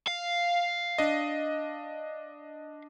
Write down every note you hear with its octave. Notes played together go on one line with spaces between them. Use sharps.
F5
D4 D#5